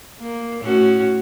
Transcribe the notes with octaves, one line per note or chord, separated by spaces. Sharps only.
A#3
A2 C#4 F#4